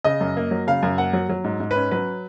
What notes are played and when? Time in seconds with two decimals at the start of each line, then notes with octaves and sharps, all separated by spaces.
0.04 C#3 D#5
0.21 F#2
0.37 A#3
0.51 F#3
0.67 C#3 F5
0.83 F#2
0.98 A#3 F#5
1.13 F#3
1.29 F#3
1.44 G#2
1.60 G#2
1.71 B4
1.76 C#4
1.91 F#3 B4